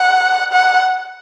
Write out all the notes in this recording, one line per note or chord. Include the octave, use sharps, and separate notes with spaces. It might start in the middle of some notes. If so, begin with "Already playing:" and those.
Already playing: F#5
F#5